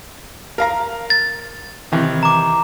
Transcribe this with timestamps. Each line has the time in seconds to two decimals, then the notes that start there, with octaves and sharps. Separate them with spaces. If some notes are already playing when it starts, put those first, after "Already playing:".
0.58 A#4 F5 A#5
1.10 A6
1.92 C3 D#3 E3
2.23 A#5 D6